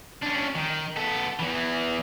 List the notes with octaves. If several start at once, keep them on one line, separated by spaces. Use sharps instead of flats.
C#4 D4
D#3
B3 A4
E2 E3